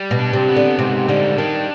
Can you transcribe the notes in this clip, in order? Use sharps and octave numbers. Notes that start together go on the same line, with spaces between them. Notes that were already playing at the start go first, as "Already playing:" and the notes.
Already playing: G3
B2
D4
C3
B3
D3
G#2 C3
D3 G3
D#3 D4